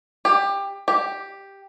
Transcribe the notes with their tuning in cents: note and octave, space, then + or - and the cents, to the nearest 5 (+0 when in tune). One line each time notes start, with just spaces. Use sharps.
G4 +20
G4 +5